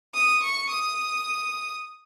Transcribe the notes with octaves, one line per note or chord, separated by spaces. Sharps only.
D#6
C#6
D#6